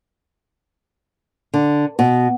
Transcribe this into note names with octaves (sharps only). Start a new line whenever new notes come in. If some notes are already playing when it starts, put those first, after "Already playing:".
D3
B2